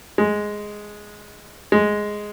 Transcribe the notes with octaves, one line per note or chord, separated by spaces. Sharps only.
G#3
G#3